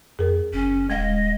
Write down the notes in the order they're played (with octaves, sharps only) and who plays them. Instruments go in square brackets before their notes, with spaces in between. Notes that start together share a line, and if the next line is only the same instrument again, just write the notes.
[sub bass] F2 [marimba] G#4 A#4
[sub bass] F#1 [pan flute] C#4
[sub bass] D#1 [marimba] G#3 F5 [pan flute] D#5